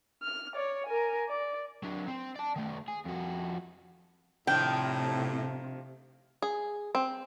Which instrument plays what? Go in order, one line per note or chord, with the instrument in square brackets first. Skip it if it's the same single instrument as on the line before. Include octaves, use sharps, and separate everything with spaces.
[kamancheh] F6
C#5 D5
A#4 G#5
D5
[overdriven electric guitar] F#3 D4
C4
D5 A5
D#3 A3
G#4
F2 F#4
[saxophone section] A2 [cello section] C3 [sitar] D#3 F3 D4 [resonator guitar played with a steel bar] G5
[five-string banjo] G#4
C4